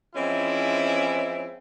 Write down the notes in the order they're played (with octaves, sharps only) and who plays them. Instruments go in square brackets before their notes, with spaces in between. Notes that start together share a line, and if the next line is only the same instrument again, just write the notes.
[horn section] E3 F3 G#3 C4 C#4 E4